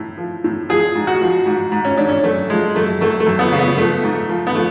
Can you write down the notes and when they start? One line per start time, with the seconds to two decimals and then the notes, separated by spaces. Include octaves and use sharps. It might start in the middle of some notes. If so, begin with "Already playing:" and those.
Already playing: A2
0.18 F3
0.44 A2
0.69 F3 G#4
0.95 G#2
1.07 F#4
1.21 F3
1.46 G#2
1.72 G#2
1.85 C#4
1.97 G#2 D4
2.08 C#4
2.24 F#2 A3
2.50 F3 G#3
2.76 F#2 A3
3.01 F#2 A3
3.20 A3
3.27 F#2
3.39 B3
3.52 C#3
3.59 B3
3.78 F3 A3
4.04 G#2
4.29 F3
4.47 B3
4.55 F3 A3